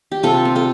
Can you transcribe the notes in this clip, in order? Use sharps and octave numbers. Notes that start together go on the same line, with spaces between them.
G4
C3 F4 A4
C4
F4 A4